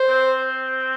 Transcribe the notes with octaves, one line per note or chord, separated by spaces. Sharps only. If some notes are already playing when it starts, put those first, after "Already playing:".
Already playing: C5
C4